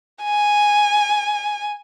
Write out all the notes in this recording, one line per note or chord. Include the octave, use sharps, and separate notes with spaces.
G#5